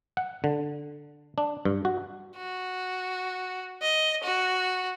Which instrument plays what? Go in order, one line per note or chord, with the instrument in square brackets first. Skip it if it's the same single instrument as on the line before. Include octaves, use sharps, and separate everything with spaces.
[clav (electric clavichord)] F#5
D3
D4
G2
F#4
[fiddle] F#4
D#5
F#4